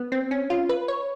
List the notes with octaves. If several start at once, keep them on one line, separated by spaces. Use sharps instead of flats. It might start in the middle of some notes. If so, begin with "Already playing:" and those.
Already playing: B3
C4
C#4
F4
B4
C#5